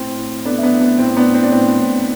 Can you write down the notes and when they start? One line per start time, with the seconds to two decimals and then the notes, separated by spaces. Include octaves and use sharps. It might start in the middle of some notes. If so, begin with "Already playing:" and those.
Already playing: A2 C4
0.18 A2
0.45 A3 B3 D4
0.58 E4
0.63 B3 D4
0.72 A2
0.81 B3
0.98 A2 C4
1.17 B3 D4
1.26 A2
1.34 C4
1.43 D4
1.52 A2 C4
1.79 A2